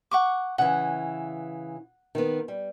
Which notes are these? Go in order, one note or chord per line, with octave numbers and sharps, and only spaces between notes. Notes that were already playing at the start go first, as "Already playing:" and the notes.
F#5 C#6 D6
C#3 E3 F#5
D#3 B3
G3